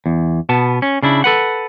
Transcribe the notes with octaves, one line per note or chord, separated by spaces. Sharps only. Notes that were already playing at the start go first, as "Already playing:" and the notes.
E2
B2 B3 A5
C#4
C#3 D4 E4
A4 B4 F#5